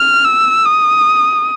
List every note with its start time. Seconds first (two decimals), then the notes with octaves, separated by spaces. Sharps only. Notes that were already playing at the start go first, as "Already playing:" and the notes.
Already playing: F6
0.25 E6
0.65 D#6